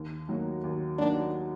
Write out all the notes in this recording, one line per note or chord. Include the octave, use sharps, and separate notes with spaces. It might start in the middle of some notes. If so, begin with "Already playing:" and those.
Already playing: D#2
D#3 F#3 A#3 F#4
D#2
D#3 F#3 A#3 D4 F#4